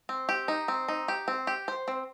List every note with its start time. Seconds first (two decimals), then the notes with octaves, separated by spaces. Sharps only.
0.09 C4
0.29 G4
0.48 D#4
0.68 C4
0.88 D#4
1.08 G4
1.28 C4
1.47 G4
1.68 C5
1.88 C4